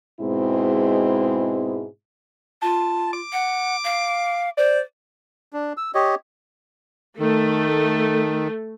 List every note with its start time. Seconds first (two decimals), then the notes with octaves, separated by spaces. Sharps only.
0.21 G#2 B2 G#3 C4 E4
2.62 F4 A5
3.13 D6
3.33 F#5
3.84 F5
4.58 C5 D5
5.53 D4
5.77 E6
5.95 G4 C#5 D#5
7.19 D#3 A3